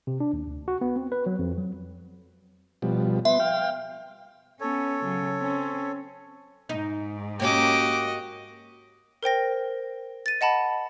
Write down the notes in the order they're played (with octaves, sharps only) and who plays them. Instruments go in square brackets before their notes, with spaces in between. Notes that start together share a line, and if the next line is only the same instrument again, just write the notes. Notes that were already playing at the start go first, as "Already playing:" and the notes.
[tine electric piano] C3
D4
D#2
D2
F#4
B3
C4
B4
F#3
F2
F#3
[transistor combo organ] B2 F3 G3
[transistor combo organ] B3 C6 [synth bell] E5
[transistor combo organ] F5 G5
[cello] B3 C#4 [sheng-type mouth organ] A4 C#5
[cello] C#3 F#3
C4 C#4
[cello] G#2 [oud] D#4
[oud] A#3 C#4 [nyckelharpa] F#4 D#5 [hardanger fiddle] G4 D6
[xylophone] A#4 C5 G5 A#6
A6 D#7
D#5 F#5 A5 B5